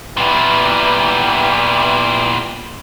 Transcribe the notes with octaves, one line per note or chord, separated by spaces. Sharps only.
A#2 E3 G3 B3